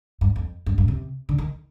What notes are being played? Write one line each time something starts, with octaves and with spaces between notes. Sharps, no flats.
G2
F2
G2
G2
C3
D3
D#3